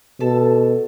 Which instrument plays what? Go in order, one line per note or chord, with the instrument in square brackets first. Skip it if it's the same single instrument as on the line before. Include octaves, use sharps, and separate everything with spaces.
[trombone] B2 [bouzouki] A4 A5